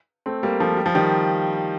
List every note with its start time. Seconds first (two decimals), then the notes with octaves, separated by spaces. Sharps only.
0.26 A3 C4
0.43 G3 A#3
0.60 F3 A3
0.77 G3
0.86 F3
0.95 D#3 G3